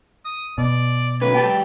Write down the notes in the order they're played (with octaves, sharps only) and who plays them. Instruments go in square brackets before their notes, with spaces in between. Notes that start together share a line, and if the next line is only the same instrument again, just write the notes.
[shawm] D#6
[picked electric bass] B2 [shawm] D5
[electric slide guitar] D3 A#3 C#4 [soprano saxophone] B4
[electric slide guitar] F#3 G4 G5 [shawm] A5